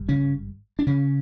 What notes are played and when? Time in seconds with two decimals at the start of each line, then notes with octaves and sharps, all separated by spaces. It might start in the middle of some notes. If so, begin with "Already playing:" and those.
Already playing: G#1 G2
0.09 C#3 C#4
0.79 D4
0.87 C#3 C#4